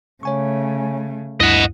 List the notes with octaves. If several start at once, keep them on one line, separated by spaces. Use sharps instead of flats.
C#3 A3 C#5 G#5 C#6
D2 G2 E4 D#5 F#5